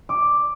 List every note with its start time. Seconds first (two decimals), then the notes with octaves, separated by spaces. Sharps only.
0.09 D6